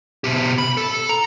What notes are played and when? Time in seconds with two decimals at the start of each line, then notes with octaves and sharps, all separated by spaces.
0.24 B2 G4
0.58 B5
0.77 A4
1.09 A#5